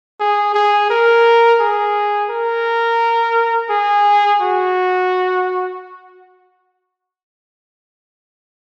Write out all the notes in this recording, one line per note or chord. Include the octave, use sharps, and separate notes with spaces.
G#4
G#4
A#4
G#4
A#4
G#4
F#4